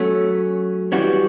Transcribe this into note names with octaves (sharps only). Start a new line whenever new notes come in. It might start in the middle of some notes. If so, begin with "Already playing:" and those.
Already playing: F#3 A3 C#4
E3 G3 C#4 F#4